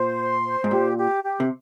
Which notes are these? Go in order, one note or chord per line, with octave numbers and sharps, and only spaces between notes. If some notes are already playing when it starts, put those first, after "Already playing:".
Already playing: A#2 C5
C6
C5
G#2
A#2 G4
G4
G4
C3